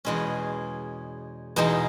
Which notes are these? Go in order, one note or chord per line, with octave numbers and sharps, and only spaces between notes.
E2 B2 G#3 C#4
E2 B2 G#3 D#4